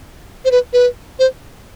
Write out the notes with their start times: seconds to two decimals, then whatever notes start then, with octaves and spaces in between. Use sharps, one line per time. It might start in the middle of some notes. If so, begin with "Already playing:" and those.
0.45 C5
0.51 B4
0.73 B4
1.19 C5